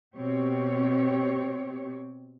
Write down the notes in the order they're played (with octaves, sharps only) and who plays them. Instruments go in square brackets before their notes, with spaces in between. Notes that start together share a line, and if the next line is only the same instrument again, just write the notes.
[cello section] B2 C4 G4 C#5